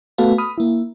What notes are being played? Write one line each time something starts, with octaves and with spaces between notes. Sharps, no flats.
A3 B3 F#4 A4 B4 F5
B5 D#6 F6
A#3 E4